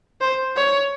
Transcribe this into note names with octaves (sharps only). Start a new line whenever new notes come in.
C5
C#5